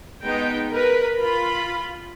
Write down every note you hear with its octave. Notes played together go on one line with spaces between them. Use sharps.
G#3 B3 D#4 G5
A#4 B4 B5
F4 B5